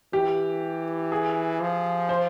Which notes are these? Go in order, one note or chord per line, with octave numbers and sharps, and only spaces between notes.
E3 G4
G#4
F3
C5